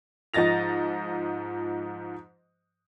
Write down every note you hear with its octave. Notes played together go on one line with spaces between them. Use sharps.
G#2 F3 D#5 A6 A#6 F7